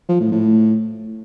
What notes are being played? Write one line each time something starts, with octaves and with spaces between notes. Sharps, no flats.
F3
A2
A2